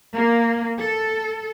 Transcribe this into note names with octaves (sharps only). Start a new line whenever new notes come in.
A#3
A4